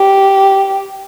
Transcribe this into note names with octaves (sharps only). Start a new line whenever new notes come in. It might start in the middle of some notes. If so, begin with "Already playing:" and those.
Already playing: G4